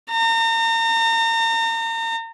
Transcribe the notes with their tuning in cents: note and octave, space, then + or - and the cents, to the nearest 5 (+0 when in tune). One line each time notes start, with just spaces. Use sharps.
A#5 -35